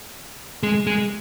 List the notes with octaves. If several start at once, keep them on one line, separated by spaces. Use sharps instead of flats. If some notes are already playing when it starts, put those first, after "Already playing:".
G#3
G#3